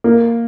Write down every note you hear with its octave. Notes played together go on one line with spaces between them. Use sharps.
A#3